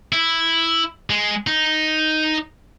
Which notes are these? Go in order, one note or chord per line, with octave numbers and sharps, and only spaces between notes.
E4
G#3
D#4